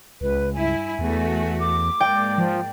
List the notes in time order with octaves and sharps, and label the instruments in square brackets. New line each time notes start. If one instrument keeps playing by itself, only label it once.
[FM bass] C#2 [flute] B4
[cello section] G2 E4 E5 [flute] G#5
[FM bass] E2 [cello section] A3 F#4
[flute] D6
[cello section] G#2 A#3 D5 [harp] G5
[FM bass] F3